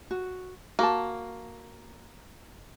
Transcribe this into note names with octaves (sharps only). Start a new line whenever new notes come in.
F#4
A#3 F#4 A#4 A5